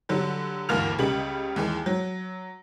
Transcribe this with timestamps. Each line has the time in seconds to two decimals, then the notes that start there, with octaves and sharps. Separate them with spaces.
0.09 D3 F#3 G3
0.69 D2 G2 E3 A#3 F6 F7
0.99 C#2 C#3 G3 F#7
1.56 D#2 E3 G#3
1.86 F#3